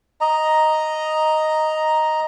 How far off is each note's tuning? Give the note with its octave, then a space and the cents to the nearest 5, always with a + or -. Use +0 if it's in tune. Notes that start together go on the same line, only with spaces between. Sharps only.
D#5 +0 A#5 +0